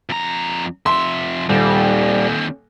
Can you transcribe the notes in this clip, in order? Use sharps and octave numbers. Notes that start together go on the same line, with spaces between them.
F2 A#5
F2 E5 C6
D#1 D#2 G3 C4